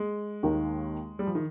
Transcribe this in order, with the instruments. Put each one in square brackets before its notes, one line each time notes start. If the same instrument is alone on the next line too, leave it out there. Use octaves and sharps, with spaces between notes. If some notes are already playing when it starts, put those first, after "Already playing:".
Already playing: [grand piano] G#3
[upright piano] D#2 D#3 A#3
[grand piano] G3
F3
D#3